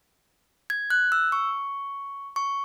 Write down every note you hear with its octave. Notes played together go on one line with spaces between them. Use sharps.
G#6
F#6
E6
C#6
C#6